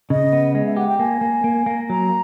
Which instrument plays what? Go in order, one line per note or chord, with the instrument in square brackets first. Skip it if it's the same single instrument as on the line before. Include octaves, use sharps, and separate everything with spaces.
[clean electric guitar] C#3 [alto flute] D#5
[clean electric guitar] B3
G#3
[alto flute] E5
[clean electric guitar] G4 [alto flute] F#5
[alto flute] G5
[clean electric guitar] A#3 [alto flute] G#5
[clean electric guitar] A#3
A#3
A#3
[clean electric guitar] F#3 [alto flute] A#5